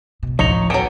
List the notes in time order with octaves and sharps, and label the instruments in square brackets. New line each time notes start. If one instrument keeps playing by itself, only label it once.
[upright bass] G#2 B2
[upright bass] A1 D2 [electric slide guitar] F3 C#5 A#5 [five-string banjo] D#4
[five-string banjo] F#3 B3 [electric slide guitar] A4 G5 G#5